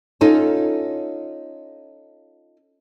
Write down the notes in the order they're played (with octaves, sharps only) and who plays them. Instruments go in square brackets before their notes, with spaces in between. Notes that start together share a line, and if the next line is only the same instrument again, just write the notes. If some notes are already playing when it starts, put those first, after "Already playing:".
[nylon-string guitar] C#4 D#4 F4 A4